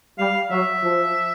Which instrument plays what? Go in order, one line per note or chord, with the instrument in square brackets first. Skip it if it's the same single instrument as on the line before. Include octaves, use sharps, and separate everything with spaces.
[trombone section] G3 [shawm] F5
[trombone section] F#3 [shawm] E5
[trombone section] F3